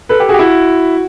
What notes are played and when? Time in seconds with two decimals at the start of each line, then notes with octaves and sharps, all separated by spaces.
0.09 A4 B4
0.20 G4 A4
0.29 F#4 G#4
0.34 G4
0.39 E4 F#4